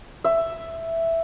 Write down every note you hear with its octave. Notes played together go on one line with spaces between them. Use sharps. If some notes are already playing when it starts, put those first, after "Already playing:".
E5